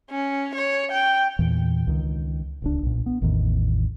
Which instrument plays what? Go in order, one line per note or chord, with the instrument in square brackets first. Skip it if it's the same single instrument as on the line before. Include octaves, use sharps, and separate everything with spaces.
[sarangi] C#4
C#5
G5
[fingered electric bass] E2 A#2 E3
C#2 D#3
D1 C#2 D4
B1 A#2
B3
A1 E2 A2 D#3